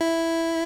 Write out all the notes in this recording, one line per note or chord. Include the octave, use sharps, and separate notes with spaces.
E4